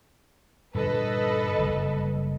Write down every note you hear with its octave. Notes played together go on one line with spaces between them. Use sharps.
G2 A#2 D3 A4 B4 D#5
F#1 G3